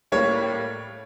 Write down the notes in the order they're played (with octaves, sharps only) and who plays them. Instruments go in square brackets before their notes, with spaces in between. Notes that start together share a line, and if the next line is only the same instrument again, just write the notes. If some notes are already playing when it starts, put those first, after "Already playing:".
[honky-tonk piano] A2 G3 A#3 [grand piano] C#5